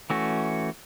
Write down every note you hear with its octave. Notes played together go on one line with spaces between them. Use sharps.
E3 A3 C#4 F#4